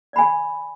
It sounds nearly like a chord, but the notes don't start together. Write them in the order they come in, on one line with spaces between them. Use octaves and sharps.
D5 B5 G#5